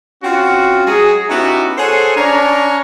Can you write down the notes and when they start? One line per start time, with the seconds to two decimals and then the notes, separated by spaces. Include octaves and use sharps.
0.23 C4 C#4 F4 F#4
0.86 F#3 G#3 F#4 G#4
1.30 B3 C#4 D#4 E4 F#4 G4
1.77 G#4 A4 C5 C#5 F#5 G#5
2.16 C#4 D4 C#5 A#5